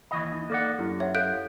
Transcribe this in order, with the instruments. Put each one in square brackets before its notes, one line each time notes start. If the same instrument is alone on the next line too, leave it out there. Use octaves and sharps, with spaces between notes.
[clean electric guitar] D#2 E3 D#5 [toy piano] B5 C#6
[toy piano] D#4
[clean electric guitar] A#3 D5 F#5 [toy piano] A4
[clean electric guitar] F#2 [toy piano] E4 G4
[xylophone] C#5 [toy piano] E5 F#5
[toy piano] A4 F5 F#5 [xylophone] F#6 G6 D7